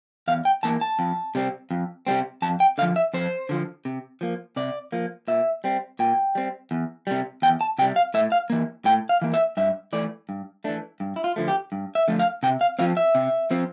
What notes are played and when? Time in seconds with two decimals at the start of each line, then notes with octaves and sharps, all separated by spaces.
0.28 E2 F5
0.45 G5
0.63 E3 A#3 A5
0.81 A5
0.99 F2
1.35 C3 G3 C4
1.71 F2
2.07 C3 G3 C4
2.42 F2 A5
2.60 G5
2.78 D3 F5
2.82 F3
2.96 E5
3.14 F2 C5
3.49 D3 F3
3.85 C3
4.21 F3 A#3
4.56 C3 D5
4.92 F3 A#3
5.28 A#2 E5
5.64 G3 C4
5.99 A#2 G5
6.35 G3 C4
6.71 E2
7.07 C3 G3
7.42 E2 G5
7.61 A5
7.78 C3 G3 G5
7.96 F5
8.14 A2 E5
8.32 F5
8.50 E3 A#3
8.85 A2 G5
9.09 F5
9.22 E3 A#3
9.34 E5
9.57 G2 E5
9.93 E3 A3 D5
10.29 G2
10.64 E3 A3 D4
11.00 G2
11.16 E4
11.24 F4
11.36 D3 F3 A3
11.48 G4
11.72 G2
11.95 E5
12.08 D3 F3 A3
12.19 F5
12.43 C3 G5
12.61 F5
12.79 F3 C4 F5
12.97 E5
13.15 C3
13.51 F3 C4